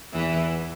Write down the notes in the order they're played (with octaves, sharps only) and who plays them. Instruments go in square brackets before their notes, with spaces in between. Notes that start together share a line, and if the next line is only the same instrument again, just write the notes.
[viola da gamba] E2 E3